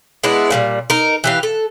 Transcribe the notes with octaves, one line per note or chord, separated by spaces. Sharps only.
G#3 B3 D4 E4
A#2 F#3 G3
D#4 A#4
E3 G4 F5
A4